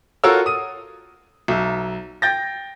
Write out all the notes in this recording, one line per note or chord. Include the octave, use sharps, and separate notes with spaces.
F4 F#4 A4 A#4 C#5 E6
D#6 D#7
B1 E5
G5 G6 A6 A#6